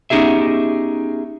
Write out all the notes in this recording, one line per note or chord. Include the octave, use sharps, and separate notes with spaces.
B3 C#4 D#4 G4 G#4 E5